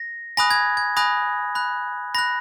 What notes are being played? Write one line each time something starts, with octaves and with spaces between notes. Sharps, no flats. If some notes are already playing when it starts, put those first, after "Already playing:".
Already playing: A#6
G#5 B5 D#6 F#6 A#6
G#6
G#6
G#5 B5 D#6 F#6 A#6
B5 F#6
B5 F#6 A#6